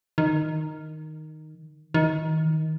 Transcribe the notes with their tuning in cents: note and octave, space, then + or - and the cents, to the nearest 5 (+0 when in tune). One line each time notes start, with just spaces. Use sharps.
D#3 -5
D#3 +20